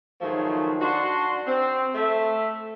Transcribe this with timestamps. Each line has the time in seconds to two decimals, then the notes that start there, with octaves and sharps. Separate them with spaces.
0.21 G#2 D#3 F3 F#3 G#3 A3
0.82 D4 F#4 C6
1.47 C4
1.95 A3 E5